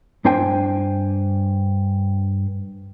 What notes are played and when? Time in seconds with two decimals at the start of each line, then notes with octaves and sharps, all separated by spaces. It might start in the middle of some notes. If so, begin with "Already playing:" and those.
0.25 G2 D4 C5 G5 G#5